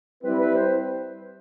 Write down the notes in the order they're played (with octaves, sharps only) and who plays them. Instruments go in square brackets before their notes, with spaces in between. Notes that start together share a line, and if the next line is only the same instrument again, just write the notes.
[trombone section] G3 C4 E4 [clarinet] B4
[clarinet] B4
C5